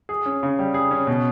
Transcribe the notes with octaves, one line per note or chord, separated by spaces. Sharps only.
G#4
C#4
C#3
G3
G#4
C#4
B2